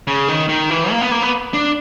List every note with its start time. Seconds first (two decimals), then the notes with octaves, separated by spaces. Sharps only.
0.07 C#3
0.28 D#3
0.49 D#3
0.70 E3
0.90 A#3
1.01 B3
1.12 A#3
1.22 B3
1.54 D4